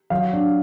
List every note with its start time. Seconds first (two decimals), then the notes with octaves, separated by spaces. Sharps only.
0.10 F#3 F5
0.33 D4